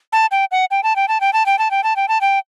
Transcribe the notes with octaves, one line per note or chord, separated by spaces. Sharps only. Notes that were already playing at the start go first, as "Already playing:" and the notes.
A5
G5
F#5
G5
A5
G5
A5
G5
A5
G5
A5
G5
A5
G5
A5
G5